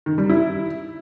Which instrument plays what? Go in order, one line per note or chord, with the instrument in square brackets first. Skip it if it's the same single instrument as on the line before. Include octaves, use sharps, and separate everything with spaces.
[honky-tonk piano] D#3
G3
E4